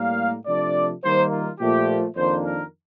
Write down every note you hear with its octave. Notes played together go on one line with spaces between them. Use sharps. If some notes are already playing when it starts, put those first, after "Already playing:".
Already playing: A2 G3 A#3 F5
C3 F3 A3 D4 D5
D#3 G3 A#3 D#4 C5
F4
A#2 F3 A3 G4
F2 D#3 A#3 D4 C5
A#4